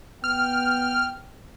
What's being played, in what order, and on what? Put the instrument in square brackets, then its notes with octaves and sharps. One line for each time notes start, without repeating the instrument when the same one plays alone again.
[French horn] B3 [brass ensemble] G5 [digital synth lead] F6